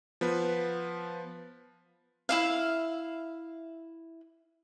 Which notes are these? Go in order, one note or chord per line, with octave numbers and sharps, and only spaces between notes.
F3 B3 B4
E4 E5 F5